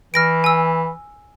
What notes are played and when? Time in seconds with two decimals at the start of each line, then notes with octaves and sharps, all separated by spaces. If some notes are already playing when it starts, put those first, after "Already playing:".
0.14 E3 F6 A#6 D7
0.44 G#5 E6